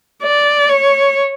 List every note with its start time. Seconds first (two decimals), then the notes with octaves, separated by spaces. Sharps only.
0.23 D5
0.69 C#5